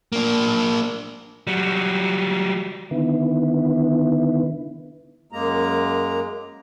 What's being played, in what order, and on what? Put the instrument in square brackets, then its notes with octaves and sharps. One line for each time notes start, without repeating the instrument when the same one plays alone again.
[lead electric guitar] A#3 D4
[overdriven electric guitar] F#3 G3
[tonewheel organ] D3 D#3 B3 E4
[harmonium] F#2 G#3 A#3 A#5